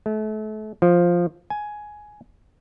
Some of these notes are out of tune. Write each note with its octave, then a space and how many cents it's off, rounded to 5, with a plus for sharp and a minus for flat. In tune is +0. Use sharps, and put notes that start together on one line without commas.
A3 -35
F3 +0
G#5 +10